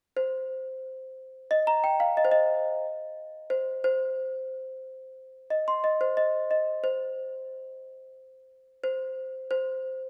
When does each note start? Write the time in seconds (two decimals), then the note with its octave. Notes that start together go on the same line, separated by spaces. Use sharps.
0.17 C5
1.51 D#5
1.67 A#5
1.84 G5
2.00 F5
2.17 D#5
2.25 C5
2.31 D#5
3.50 C5
3.84 C5
5.50 D#5
5.68 C6
5.84 D#5
6.01 C5
6.17 D#5
6.51 D#5
6.84 C5
8.84 C5
9.51 C5